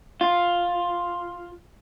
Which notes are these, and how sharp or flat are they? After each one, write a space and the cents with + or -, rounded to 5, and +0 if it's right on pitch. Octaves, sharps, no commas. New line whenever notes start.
F4 +5